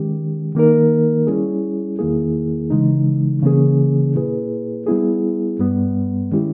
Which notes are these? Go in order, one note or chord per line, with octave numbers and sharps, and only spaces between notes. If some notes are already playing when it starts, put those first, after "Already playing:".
Already playing: D#3 G#3 C#4 G4
D#3 A#3 D#4 A#4
G3 C#4 E4 G#4
E2 D#3 A#3 E4 G#4
C#3 E3 G#3 D#4
C#3 E3 A#3 C#4 G#4
A#2 A#3 E4 G#4 B4
G3 B3 E4 G#4
G2 G3 B3
D#3 G#3 C#4 E4 G4